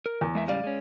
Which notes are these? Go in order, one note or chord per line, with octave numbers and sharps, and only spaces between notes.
A#4
E2
G#3 A#3 E5
G#2 C#3 G3 D5 F5
G#3 C#4